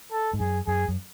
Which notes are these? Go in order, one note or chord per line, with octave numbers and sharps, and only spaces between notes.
A4
G#2
F#2 G#4
F#2 G#4
F#2